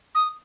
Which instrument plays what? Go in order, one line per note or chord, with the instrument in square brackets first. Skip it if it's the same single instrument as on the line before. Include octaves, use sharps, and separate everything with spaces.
[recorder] D#6